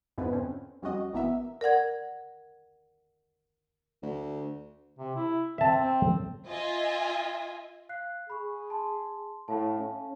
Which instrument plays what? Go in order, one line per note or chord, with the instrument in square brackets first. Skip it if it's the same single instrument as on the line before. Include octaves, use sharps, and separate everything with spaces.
[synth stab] F2 G#2 B3 E4 B4
D3 C4 C#4
F2 G3 C#4 F#4 D#5
A1 B2 E3 B3 A#4 E5
[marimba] A#4 D5 F#5 G#6
[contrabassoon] D2
[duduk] C3
E4
[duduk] C4 [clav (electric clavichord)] E5 A5
[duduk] C4
[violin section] F4 D#5 E5 G#5
[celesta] F5 F#6 C7
[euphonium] G#4 [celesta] B5 C#6
[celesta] A5 C6
[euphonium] A2 [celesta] C#5 F5 A5
[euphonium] C#4